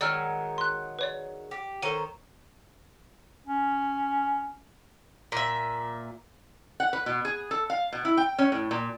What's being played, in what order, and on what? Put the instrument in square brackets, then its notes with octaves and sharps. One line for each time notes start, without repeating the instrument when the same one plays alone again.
[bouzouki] D#3 F#3 G#3 [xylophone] D5 E6 F6
[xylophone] C6 F#6
B4 C#5 D5
[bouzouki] G4
[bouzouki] D#3 C5 C#5 [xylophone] A4 D#7
[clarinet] C#4
[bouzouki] A#2 E5
[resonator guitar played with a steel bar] F#5
B4
B2
G#4
A4
F5
B2
E4
G5
C#4
A2
A#2